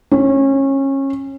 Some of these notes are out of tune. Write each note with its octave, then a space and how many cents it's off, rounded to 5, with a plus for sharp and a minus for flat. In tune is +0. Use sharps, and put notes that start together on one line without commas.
C#4 -25